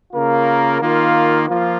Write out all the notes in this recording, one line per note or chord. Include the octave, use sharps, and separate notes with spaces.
C#3 A#3 F4 A#4
D#3 A#3 F4
F3 A#3 F4